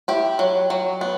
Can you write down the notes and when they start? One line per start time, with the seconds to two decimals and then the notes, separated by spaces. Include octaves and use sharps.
0.08 E4 G4
0.39 F#3
0.70 F#3
1.01 B3